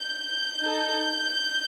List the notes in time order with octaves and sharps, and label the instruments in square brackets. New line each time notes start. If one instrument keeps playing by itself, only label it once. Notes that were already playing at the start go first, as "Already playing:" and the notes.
Already playing: [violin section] G6
D#4 A4